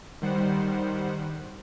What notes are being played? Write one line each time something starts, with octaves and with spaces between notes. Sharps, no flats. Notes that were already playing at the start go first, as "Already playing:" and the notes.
D#3 G3 C5 F#5